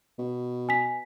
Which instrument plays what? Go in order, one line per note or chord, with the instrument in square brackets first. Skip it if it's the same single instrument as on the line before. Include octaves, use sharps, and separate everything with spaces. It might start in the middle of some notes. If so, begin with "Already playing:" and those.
[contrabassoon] B2
[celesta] G#5 B6